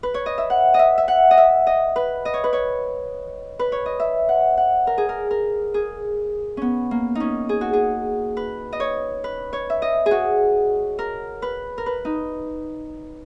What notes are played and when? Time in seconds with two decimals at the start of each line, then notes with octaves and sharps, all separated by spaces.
0.03 B4
0.14 C#5
0.26 D#5
0.38 E5
0.50 F#5
0.74 D#5 E5
0.98 E5
1.08 F#5
1.31 D#5
1.37 E5
1.67 D#5
1.96 B4
2.25 D#5
2.34 C#5
2.44 B4
2.53 C#5
3.59 B4
3.72 C#5
3.86 D#5
4.00 E5
4.29 F#5
4.57 F#5
4.87 A#4
4.98 G#4
5.09 A#4
5.31 A#4
5.74 G#4
6.57 B3 C#4
6.91 A#3
7.15 C#4 D#4
7.49 G#4
7.61 F#4
7.73 G#4
8.37 B4
8.73 D#5
8.80 C#5
9.24 B4
9.53 C#5
9.70 E5
9.82 D#5
10.06 G#4
10.11 F#4
10.99 A#4
11.42 B4
11.78 A#4
11.86 B4
12.05 D#4